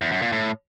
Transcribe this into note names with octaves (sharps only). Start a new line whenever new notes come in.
E2
F#2
A#2
A2